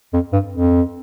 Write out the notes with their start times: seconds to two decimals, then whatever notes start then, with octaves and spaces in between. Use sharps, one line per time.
0.13 F2
0.33 G2
0.53 F2